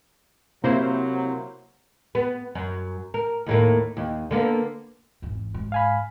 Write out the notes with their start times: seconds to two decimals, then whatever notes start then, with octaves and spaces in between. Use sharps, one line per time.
0.64 C3 F#3 A#3 E4 C5
2.15 B3
2.55 F#2
3.14 A#4
3.46 D#2 A2 A#3
3.97 D#2
4.31 D3 A#3 B3
5.22 G#1 E2
5.54 G#2
5.72 F5 G#5 B5